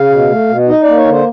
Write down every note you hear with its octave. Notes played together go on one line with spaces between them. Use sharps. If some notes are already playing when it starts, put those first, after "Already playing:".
Already playing: C#3 F5
B2
A3
B2
D#4 D#5
A#3 D5
C#5
D3 C5